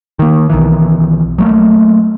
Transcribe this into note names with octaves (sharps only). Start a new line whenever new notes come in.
D#3 A#3
B1 D#3 E3
F#3 A3 A#3